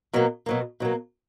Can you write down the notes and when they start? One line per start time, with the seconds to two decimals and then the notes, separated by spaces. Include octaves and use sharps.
0.13 B2 F#3 A#3
0.46 B2 F#3 A#3
0.80 B2 F#3 A#3